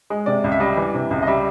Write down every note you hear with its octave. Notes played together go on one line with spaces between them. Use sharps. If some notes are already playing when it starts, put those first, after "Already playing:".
G#3
C3 D5
C#2
E5
G3 D#5
E3
C3
C#2
D#5
G3 E5